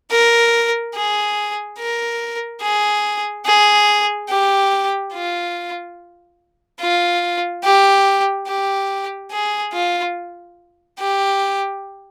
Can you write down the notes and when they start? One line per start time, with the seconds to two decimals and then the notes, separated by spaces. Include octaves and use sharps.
0.11 A#4
0.95 G#4
1.78 A#4
2.62 G#4
3.46 G#4
4.29 G4
5.13 F4
6.80 F4
7.64 G4
8.47 G4
9.31 G#4
9.73 F4
10.99 G4